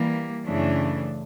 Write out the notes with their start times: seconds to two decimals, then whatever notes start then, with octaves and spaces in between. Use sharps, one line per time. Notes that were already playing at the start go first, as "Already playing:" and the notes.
Already playing: E3 G3 A#3
0.46 F#2 C#3 E3 A3 D4